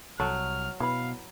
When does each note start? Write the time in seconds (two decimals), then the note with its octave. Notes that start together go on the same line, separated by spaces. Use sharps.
0.20 C2 F#3 A4 F6
0.80 B2 E4 B4 F5 B5